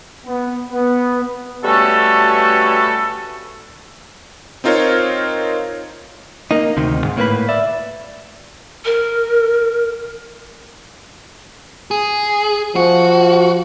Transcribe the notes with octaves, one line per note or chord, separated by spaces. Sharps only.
B3
B3
B2 G3 A3 C#4 F#4 A4
C4 D#4 F4 A#4 C5 C#5
A#3 D#4
D2 C3 D#3
G#2
A2 A#3 B4 B5
D5 E5
A#4
G#4
F3 F#4